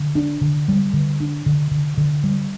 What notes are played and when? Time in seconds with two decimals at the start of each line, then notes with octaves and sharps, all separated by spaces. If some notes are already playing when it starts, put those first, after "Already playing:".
Already playing: D3
0.15 D4
0.41 D3
0.68 G3
0.93 D3
1.20 D4
1.46 D3
1.71 D3
1.97 D3
2.24 G3